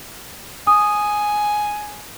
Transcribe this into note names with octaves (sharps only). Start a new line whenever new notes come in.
G#5 D#6